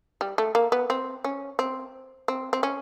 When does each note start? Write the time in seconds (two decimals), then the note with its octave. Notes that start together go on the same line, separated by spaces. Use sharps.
0.21 G3
0.38 A3
0.55 A#3
0.72 B3
0.90 C4
1.24 C#4
1.59 C4
2.28 C4
2.53 C4
2.63 C#4